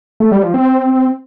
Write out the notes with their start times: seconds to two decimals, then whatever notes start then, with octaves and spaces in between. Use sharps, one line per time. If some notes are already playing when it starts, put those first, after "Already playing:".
0.20 A3
0.32 G3
0.43 F3
0.54 C4